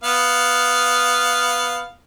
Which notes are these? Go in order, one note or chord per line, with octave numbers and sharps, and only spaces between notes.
B3 F5